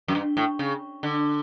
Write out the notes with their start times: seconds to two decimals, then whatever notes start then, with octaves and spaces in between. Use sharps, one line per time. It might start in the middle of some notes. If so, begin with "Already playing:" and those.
0.08 F#2
0.15 G2
0.37 A2
0.59 C#3
1.03 D3